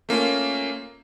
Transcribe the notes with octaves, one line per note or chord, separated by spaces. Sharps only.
A3 A#3 C#4 F4